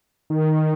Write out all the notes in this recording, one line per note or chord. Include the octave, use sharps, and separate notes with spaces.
D#3